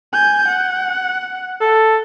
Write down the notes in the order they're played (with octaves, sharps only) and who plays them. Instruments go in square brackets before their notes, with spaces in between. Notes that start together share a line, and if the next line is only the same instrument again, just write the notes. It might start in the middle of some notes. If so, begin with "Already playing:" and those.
[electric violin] G#5 G6
F#5
[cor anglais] A4